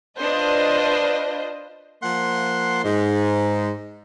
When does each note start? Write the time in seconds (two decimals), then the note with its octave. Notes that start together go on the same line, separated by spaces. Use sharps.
0.18 D4 F4 B4 C5 D#5
2.03 F3 A#3 F#5 C6
2.84 G#2